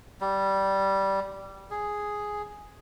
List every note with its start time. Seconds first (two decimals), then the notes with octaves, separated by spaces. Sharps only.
0.21 G3
1.71 G#4